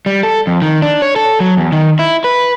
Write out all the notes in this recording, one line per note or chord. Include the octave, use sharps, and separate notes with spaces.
G3
A4
F2
D#3
D4
C#5
A4
F#3
E2
D#3
E4
B4